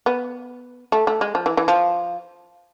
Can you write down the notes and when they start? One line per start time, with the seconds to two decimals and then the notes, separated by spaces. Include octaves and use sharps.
0.06 B3
0.92 A3
1.07 A3
1.21 G#3
1.35 F3
1.46 E3
1.57 E3
1.68 F3